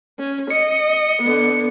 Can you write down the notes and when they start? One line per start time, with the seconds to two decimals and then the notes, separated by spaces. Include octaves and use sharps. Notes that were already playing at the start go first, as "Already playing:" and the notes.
0.19 C#4
0.50 D#5 C#7
1.22 D3 B3